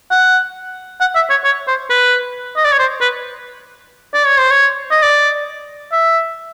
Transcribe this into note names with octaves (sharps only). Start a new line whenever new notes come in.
F#5
F#5
E5
C#5
C#5
C5
B4
D#5
D5
C#5
C5
B4
D5
C#5
C5
C#5
D#5
D5
E5